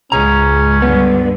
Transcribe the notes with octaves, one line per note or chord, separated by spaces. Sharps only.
C#2 G#2 C#4 G#4 A#5
G2 D3 B3